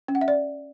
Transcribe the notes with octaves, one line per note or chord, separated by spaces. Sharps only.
C#4
F#5
E5
D5